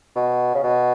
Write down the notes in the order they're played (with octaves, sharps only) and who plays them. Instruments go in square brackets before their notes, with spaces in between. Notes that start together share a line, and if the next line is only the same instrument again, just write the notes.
[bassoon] B2
C#3
B2